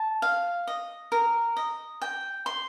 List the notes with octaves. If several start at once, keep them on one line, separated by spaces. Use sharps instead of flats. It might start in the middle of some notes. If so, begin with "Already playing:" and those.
Already playing: A5
F5
D#5
A#4
D#5
G5
C6